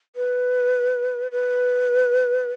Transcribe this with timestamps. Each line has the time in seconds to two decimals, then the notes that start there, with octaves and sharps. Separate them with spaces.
0.16 B4
1.31 B4